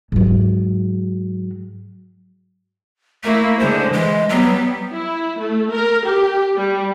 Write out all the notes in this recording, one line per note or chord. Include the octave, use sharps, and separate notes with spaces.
G#2 F#3
A3 A#3 E4
D3 G#3 C5
E3 G#3
F#3 G3 B3
E4
A3
A#4
G4
G3